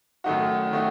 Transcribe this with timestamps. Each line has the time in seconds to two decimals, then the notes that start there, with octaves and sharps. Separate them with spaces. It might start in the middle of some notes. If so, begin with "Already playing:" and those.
0.24 F#2 D#3 A3 D#4 F#4
0.72 D#3 A3 D#4 F#4